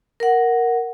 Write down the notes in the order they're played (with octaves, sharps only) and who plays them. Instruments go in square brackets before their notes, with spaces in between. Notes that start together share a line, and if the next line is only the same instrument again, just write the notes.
[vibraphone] A#4 F#5